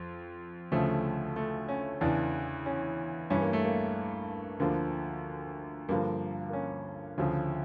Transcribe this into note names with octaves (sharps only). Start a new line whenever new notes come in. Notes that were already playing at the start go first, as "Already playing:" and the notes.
Already playing: F2
D2 C#3 F3 A3
A3
C#4
E2 C#3 E3 D4
C#4
G2 E3 C#4
A#3
A3
A#3
D2 D3 F3 A#3
G2 D3 F3 A#3
A#3
C#4
D2 C#3 F3